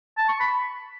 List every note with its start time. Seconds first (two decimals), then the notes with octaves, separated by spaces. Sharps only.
0.18 A5
0.29 C#6
0.40 B5